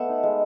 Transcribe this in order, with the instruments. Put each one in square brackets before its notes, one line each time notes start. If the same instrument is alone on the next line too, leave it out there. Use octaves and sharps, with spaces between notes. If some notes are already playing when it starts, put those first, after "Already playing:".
Already playing: [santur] A3 B3 E5 F#5
D#4
G#3